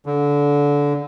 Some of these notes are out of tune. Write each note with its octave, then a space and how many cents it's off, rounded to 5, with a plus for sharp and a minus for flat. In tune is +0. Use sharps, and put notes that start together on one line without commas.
D3 -25